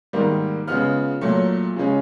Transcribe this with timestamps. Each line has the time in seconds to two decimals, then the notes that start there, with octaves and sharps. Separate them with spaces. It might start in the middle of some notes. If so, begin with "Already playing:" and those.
0.13 G#2 D#3 G3 A#3
0.68 C#3 F3 G#3 B3 F6
1.21 A#2 F#3 A3
1.76 C#3 F3 G#3 C#4